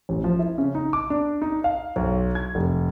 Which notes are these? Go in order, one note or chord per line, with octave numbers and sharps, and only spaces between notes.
A1
F3
E4
C#3
D#4
D6
D4
D#4
F5
B1
G#6
F1